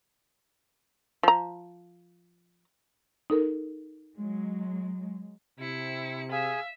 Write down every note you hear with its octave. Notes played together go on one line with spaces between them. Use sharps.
F3 A#5
D#4 A4 A#4
F#3 G#3
C3 E4 C#7
G#4 E5 F5 G#5